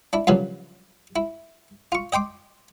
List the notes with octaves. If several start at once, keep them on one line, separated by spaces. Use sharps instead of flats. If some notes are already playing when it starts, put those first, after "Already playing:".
D4 E4
G2 A#2 C#3 F3 F#3
E4
F4 C#6
D#5 G5 C6 D6